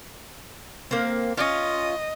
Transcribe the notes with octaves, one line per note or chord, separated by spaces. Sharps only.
A#3 C4
C#4 F4 D#5